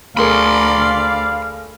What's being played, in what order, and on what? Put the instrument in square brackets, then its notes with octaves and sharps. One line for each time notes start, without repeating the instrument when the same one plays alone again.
[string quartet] D2 D5 [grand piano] A3 G#4 A#4 [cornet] F5 [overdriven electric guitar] B5 C6